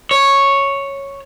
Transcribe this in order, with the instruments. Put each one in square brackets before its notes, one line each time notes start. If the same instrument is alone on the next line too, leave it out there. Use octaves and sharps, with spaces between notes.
[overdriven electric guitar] C#5